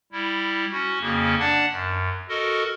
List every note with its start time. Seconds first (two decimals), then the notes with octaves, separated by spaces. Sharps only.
0.12 G3 E4
0.71 C#4 F#4
1.01 F2 C#3 A#3 C#4
1.39 D4 D5 F#5 A5
1.70 F#2
2.29 F#4 A4 A#4 D#5